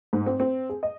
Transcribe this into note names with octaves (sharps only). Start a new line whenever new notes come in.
G#2
C4
C4
G#4
D#5